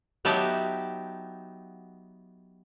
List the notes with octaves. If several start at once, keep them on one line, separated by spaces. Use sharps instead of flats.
F#3 B3 D#4 G4 E5 A5